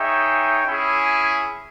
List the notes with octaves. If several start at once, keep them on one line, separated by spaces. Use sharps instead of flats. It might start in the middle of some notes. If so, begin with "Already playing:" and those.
Already playing: D#4 G#4 C#5 E5 G5
C#4 E4 G#4